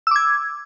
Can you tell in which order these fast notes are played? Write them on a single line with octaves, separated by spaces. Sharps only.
E6 D6 G#6